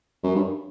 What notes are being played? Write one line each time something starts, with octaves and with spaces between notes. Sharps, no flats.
F#2
G2